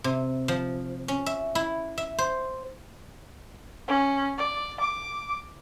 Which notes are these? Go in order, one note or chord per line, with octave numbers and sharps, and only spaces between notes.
C3
F3
C#4
E5
E4
E5
C5
C#4
D5
D6